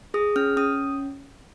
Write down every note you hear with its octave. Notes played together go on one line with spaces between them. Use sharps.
G#4 D#6
C#4 F6
C#4 D#6